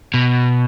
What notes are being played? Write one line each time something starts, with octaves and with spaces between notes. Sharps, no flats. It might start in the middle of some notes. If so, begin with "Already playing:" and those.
B2